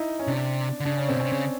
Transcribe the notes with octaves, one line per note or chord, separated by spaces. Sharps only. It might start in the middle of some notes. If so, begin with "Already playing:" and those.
Already playing: D#4 E4
C#4
C3 D4
D3
C#3 D4
C#4
B2 C4
C3 C#4
C#3